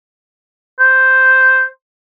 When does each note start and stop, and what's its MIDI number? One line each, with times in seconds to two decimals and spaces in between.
0.80 1.65 72